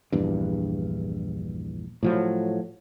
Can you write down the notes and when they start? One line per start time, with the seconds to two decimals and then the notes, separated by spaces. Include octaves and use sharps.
0.12 A#1 E2 G2
2.03 A2 F3 F#3